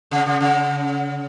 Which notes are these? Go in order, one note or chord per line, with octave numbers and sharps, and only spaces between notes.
C#3
C#3
C#3